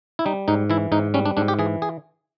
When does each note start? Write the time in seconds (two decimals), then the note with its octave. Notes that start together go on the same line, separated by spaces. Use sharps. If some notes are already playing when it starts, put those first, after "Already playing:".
0.19 E4
0.26 G3 D#4
0.48 G#2 D#4
0.70 E3 E4
0.92 G#2 D#4
1.14 G3 C#4
1.26 D4
1.37 G#2 D4
1.48 G4
1.59 E3 G#4
1.82 G#4